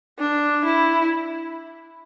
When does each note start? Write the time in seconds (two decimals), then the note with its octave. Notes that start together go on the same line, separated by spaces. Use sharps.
0.19 D4
0.65 E4